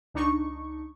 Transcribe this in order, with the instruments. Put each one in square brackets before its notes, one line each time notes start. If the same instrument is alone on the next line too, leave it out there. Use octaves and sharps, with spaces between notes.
[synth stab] C#2 D4 D#4 C#6